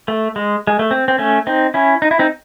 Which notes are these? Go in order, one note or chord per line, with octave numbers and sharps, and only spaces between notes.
A3
G#3
G#3
A3
C4
C4
A3 C#4
C4 D#4
C#4 E4
D#4
E4
C4 D#4